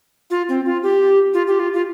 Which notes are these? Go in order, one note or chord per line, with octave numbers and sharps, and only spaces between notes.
F4
C4
F4
G4
F4
G4
F4
F4